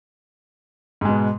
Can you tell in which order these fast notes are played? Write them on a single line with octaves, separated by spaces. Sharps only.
G#2 G#3 B2